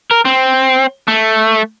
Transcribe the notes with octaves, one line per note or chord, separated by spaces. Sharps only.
A#4
C4
A3